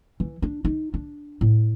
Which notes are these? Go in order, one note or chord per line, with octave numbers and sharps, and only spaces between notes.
E3
D4
D#4
D4
A2